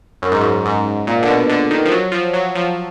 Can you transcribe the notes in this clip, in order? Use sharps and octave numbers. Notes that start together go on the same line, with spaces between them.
F#2
G#2
F#2
G#2
A#2
D3
B2
D3
D#3
F3
F#3
F3
F#3
F3